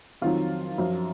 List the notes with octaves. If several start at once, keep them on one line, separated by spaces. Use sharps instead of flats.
F2 D#3 F#3 F4
F#2 F3